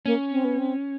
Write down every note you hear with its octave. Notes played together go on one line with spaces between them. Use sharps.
A#3 C#4
C4
B3
C4